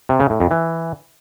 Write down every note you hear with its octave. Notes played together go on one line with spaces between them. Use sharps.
C3
C#3
A2
F2
E3